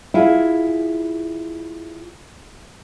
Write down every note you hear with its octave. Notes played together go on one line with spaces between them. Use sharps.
E4 F4 G#4